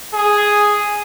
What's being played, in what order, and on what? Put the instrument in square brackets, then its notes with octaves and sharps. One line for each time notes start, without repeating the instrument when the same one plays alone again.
[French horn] G#4